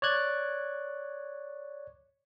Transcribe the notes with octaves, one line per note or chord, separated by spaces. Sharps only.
C#5 D5 F#6 G#6